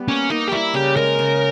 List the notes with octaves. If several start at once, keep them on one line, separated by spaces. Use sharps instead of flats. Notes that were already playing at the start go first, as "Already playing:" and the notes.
Already playing: G3 B3
A#3 C#4
A#3 D#4
G4
G3 E4
C#3 G4
G#3 A#4
C#3